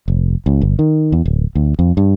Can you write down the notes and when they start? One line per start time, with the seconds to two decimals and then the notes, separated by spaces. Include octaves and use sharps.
0.08 F1
0.46 C#2
0.62 G1
0.79 D#3
1.12 E2
1.25 D1
1.55 D2
1.79 F2
1.97 G2